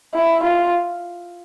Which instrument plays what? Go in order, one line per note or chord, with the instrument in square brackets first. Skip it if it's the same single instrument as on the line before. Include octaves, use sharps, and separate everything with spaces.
[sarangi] E4
F4